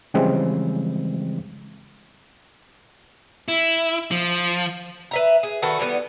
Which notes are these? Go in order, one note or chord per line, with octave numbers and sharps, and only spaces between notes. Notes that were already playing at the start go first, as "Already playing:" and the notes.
C#3 E3 F3 G3 G#3 C4
E4
F3
B4 E5 A#5
G#4
D#3 F#4 A4 B4
E3 G3 B3